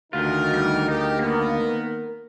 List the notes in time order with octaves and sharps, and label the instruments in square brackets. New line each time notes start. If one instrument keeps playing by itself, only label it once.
[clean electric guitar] D2 F4 [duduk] D#3 [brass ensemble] D#4 F#4 A#4
[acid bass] G3
[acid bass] D#4 [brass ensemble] G4 [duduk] A#4
[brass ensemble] D#3 B3 [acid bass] A#3